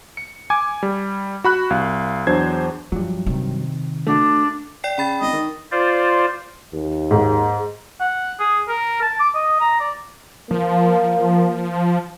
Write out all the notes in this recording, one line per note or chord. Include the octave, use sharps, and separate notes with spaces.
C#7
G#5 D6 G#6
G3
F#4 B5 F#6
C2 F5
E2 F#3 D4 C5 G#6
G2 F3 F#3
C3 D#3
A3 D4 F#4
D5 G5 C7
C#3 G5 B5 A6
G#1 D#5
D#3
F4 C5 D5
D#2
G#2
F#5
G#4
A#4
A5
D6
D#5
A#5
D5
F3 A#3